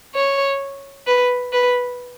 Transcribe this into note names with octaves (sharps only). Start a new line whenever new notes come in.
C#5
B4
B4